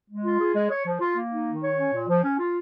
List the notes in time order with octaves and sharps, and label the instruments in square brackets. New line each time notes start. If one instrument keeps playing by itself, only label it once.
[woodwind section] G#3
F4
G#4
G#3
C#5
F3
F4
A#3
D#4
D#3
C#5
C#4
A#2
F3
C#4
F4